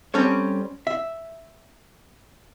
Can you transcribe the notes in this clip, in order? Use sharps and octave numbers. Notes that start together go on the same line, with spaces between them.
G3 C4 C#4 A4 C#5
E5